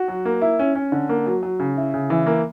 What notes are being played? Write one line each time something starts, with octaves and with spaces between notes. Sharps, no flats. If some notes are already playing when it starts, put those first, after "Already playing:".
Already playing: F#4
F#3
A#3
E4
C#4
C#4
D3
A#3
F#3
F#3
C#3
E4
C#3
E3
A#3